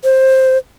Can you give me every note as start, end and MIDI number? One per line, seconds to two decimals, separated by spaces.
0.04 0.58 72